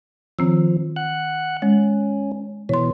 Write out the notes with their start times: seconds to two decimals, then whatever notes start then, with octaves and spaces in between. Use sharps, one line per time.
0.39 D#3 F3 C4 E6
0.96 F#5 F#6
1.62 G#3 C#4
2.69 B2 E3 C#5 C6